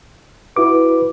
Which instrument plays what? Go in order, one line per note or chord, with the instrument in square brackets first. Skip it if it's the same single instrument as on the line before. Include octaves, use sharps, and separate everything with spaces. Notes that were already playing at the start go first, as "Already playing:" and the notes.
[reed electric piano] E4 F#4 D6 [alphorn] B4